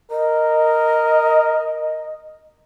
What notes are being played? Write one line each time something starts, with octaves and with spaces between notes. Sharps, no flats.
A#4 D#5